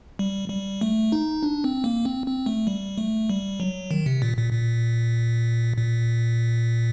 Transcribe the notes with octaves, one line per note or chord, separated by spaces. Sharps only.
G3
G3
A3
D#4
D4
C4
A#3
C4
C4
A3
G3
A3
G3
F#3
D#3
C3
A#2
A#2
A#2
A#2